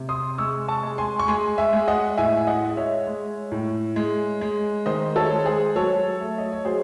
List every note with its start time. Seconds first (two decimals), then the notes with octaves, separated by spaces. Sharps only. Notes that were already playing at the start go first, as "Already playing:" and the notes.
Already playing: C3
0.09 C6 D#6
0.38 G#3 C#6 E6
0.68 A5 C#6
0.83 G#3
0.98 G#5 C6
1.19 C#6
1.28 G#3 G#5 C6
1.58 E5 G#5
1.73 G#3
1.88 D#5 F#5
2.17 A2 E5 G#5
2.47 D#5 F#5
2.62 G#3
2.70 D#5
2.77 C#5 E5
3.07 G#3
3.52 A2
3.96 G#3
4.41 G#3
4.86 D#3 C5 D#5
5.16 A4 C#5
5.31 G#3
5.46 G#4 C5
5.76 F#3 A4 C#5
6.20 A3
6.38 D#5
6.52 C#5
6.65 F#3 G#4 C5